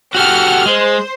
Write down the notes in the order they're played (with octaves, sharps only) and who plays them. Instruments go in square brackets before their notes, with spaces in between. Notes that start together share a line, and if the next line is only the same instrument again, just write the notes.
[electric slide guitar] F#4 G4 A4 [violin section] F#5 F6
[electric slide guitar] G#3 [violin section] C5